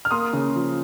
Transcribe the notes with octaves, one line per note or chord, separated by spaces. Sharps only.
F6
A#3 C6 D#6
C#3
F3